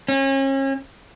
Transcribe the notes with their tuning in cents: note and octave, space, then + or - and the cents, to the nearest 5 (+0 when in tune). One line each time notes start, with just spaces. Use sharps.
C#4 -35